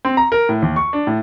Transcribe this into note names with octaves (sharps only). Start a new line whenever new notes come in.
C4
A#5
A#4
A2
D#2
C#6
D4
A2